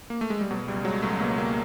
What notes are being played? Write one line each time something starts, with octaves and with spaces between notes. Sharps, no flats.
A#3
A3
G#3
G3
B2 F#3
C#2 G3
F#3 G#3
C#2 A3
B2 A#3
C#2 A#3